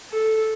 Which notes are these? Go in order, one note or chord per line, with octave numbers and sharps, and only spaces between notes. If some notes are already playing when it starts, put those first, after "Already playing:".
A4